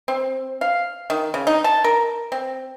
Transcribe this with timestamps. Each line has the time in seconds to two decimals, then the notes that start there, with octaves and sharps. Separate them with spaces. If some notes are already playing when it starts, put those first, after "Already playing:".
0.08 C4
0.61 F5
1.10 D#3
1.34 C#3
1.47 D#4
1.64 A5
1.84 A#4
2.32 C4